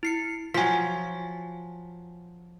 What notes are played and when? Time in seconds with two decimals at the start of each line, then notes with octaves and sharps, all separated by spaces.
0.03 E4 C7 C#7
0.54 F3 F#3 G#5 B6